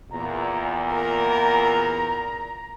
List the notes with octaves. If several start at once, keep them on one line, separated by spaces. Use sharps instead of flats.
E2 A#2 A#5
A#4 A#5